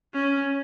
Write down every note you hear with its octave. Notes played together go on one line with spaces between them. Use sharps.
C#4